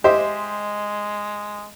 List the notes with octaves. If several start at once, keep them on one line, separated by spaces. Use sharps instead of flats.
G#3 G4 C5 D#5 E5